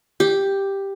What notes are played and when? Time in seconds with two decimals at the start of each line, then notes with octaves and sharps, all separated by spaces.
0.20 G4